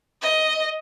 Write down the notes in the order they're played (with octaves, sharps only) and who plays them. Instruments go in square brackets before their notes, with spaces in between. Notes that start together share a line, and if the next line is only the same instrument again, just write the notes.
[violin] D#5